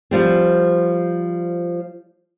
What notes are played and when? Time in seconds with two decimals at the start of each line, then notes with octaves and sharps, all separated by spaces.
0.11 F3 G3 C4